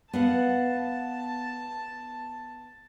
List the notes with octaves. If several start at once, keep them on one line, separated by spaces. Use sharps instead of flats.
B3 F5 F#5 A5